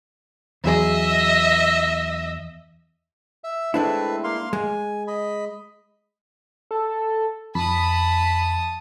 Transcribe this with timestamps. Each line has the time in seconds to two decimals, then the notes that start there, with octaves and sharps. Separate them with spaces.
0.64 E2 F#3 G#4 D#5 E5
3.44 E5
3.74 G#3 A3 C4 D4 E4 B4
4.24 A#3 F5 C6
4.53 G#3 G#5
5.07 D#5 B5
6.71 A4
7.55 F2 A5 B5 D#6